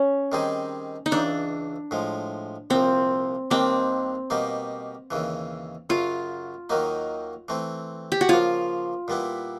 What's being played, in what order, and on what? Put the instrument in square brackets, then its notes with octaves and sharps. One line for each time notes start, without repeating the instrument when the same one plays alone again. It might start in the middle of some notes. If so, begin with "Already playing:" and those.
Already playing: [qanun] C#4
[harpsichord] D#3 G3 C4 D#4 G#4
[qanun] D#4
[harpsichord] C#2 C#3 E3 [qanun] D4
[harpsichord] A2 F3 G#3
[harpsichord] C2 A#2 F3 [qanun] C4
[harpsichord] D#2 D#3 G3 A#3 D4 [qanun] C4
[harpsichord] B2 G3 A#3 D#4
D#2 C#3 E3
[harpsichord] F#2 C#3 F#3 [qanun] F4
[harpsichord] D#2 D#3 F#3 A#3 D#4
E3 A3 C4
[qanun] G4
F#4
[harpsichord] C#3 F3 A#3 [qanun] F4
[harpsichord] A#2 G3 B3 E4